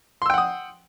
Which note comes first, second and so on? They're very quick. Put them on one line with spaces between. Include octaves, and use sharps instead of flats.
C6 E6 G5 F#5 D#6